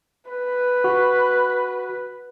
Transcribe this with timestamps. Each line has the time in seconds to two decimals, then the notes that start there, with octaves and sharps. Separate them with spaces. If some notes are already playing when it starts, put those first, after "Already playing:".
0.30 B4
0.84 F#4